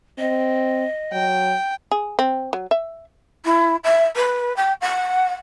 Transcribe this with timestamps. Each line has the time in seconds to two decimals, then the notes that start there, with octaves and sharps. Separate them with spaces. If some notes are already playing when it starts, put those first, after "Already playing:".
0.19 C4 D#5
1.12 F#3 G5
1.91 G#4
2.19 C4
2.53 F#3
2.71 E5
3.45 E4
3.84 E5
4.16 B4
4.56 G5
4.81 F#5